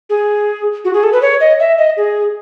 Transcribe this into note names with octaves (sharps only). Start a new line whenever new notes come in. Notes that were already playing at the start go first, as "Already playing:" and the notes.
G#4
F#4
G#4
A4
B4
C#5
D#5
E5
D#5
G#4